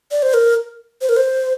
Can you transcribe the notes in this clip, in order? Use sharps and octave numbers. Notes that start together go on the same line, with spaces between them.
D5
C5
A#4
C5
A#4
C5